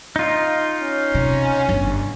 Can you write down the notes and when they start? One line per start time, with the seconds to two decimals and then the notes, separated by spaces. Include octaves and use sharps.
0.16 D#4 F4
0.82 C#4
1.15 C3
1.69 G1